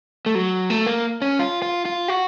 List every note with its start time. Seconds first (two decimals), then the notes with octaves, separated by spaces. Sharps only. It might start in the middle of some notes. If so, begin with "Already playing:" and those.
0.26 A3
0.35 F#3
0.70 A3
0.87 A#3
1.22 C#4
1.39 F4
1.62 F4
1.85 F4
2.08 F#4